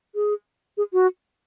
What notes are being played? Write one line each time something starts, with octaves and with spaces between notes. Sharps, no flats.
G#4
G#4
F#4